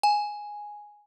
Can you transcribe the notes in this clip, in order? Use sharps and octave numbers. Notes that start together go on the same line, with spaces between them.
G#5